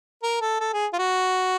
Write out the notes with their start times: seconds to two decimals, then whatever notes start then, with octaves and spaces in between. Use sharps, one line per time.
0.23 A#4
0.41 A4
0.60 A4
0.73 G#4
0.93 F4
0.99 F#4